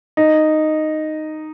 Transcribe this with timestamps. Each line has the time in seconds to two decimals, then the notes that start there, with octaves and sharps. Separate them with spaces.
0.17 D#4